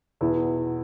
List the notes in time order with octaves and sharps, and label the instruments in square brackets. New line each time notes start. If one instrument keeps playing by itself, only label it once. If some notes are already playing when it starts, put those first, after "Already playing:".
[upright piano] E2 B2 E4